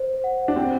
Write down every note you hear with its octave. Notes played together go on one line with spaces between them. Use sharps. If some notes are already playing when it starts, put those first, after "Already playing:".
Already playing: C5
F#5
D4
C4 G4